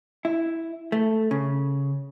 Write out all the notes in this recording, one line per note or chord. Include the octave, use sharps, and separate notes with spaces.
E4
A3
C#3